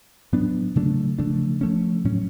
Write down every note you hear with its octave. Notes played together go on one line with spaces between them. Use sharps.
A2 F#3 B3 D4
C#3 F#3 A3 D4
C#3 F3 A3 D4
F3 A3 C#4
A2 F#3 C#4